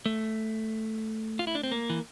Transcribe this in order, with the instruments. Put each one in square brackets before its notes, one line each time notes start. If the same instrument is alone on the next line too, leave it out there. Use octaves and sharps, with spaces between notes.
[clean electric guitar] A3
F4
E4
D4
C4
A#3
E3